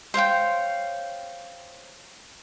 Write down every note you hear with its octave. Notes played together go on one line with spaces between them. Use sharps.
C5 C#5 F5 G5